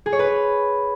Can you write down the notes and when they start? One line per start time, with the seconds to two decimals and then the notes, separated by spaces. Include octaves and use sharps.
0.06 G#4
0.13 C#5
0.19 B4